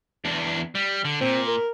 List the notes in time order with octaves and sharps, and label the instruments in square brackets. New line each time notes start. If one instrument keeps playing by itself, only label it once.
[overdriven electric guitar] E2 D4
G3
D3
[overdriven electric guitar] A#2 [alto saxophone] C4
[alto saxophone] A#4